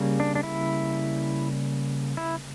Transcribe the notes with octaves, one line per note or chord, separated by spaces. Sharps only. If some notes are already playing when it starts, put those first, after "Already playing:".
Already playing: C#3 G3 A#3
D4
D4
E4
E4